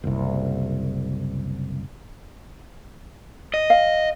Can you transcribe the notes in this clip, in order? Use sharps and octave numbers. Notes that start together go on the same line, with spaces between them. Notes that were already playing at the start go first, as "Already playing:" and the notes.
F#1 C2
D#5
F5